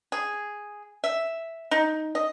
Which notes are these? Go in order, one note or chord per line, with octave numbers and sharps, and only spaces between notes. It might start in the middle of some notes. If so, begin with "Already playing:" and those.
G#4
E5
D#4
D#5